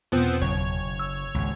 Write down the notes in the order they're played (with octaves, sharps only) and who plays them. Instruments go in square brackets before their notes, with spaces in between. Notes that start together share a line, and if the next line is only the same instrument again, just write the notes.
[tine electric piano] E2 B2 [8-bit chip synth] F3 B3 C4
[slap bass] F#1 [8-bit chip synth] C#5
[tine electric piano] E6
[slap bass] G#1 C#2